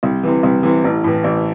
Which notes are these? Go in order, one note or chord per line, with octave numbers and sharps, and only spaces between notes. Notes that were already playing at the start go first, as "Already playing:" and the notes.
C2
C3 E3
C2
C3 E3
A1
A2 E3
A1